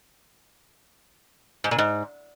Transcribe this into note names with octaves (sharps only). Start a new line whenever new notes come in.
G#2
A#2
G#2